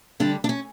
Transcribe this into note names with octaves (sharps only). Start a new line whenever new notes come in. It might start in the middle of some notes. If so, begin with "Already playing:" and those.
G2 D3 G3 D4
D4
C#4